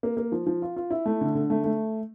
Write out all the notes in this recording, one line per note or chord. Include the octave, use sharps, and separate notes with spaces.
A#3
A#3
F3
F3
F4
F4
E4
A3
D3
D3
A3
A3